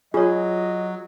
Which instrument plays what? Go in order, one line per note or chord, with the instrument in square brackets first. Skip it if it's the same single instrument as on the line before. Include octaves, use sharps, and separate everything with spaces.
[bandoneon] F#3 [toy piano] F4 C#5 [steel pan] G#4 [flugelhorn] D#5